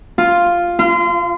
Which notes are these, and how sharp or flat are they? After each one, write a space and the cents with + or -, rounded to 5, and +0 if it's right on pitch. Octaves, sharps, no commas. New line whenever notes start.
F4 +0
F4 -35